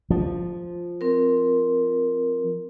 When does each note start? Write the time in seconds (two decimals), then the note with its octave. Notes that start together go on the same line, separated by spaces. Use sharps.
0.10 F3
1.01 C4 A#4